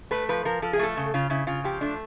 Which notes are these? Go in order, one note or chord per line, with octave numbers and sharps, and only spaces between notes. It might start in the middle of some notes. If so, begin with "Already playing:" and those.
A3 B4
F3 B4
F3 A#4
F3 A4
G#4
A3 A4
C#3
C#3 F4
C#3 E4
C#3 F4
F3 G4
A3 D4